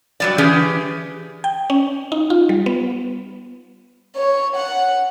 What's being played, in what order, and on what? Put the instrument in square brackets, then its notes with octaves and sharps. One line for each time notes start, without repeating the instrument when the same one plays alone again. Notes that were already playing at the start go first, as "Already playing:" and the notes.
[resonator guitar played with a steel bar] F#3 G3 D5
E3 C#4 G4 G#4
[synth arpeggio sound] G5
C#4
D#4
F4
G3
B3
[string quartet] C#5
F#5